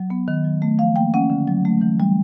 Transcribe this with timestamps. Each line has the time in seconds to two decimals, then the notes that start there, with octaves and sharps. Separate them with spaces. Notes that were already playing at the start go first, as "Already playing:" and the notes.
Already playing: F#3
0.10 B3
0.28 D#3
0.44 F#3
0.62 A3
0.79 F3 F5
0.96 A#3 G5
1.14 C#4 F#5
1.30 D3
1.47 F#3
1.65 A3
1.81 E3
2.00 G3